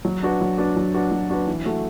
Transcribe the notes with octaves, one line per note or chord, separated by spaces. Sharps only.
F#3
D4 F#4 B4
F#3
D4 F#4 B4
F#3
D4 F#4 B4
F#3
D4 F#4 B4
E3
A3 F#4 A4